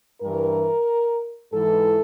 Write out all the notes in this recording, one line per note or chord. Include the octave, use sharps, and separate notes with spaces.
G2 E3 A#4
G#2 E3 A4